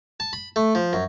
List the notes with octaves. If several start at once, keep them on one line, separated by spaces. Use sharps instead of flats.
A5
B5
A3
F3
F#2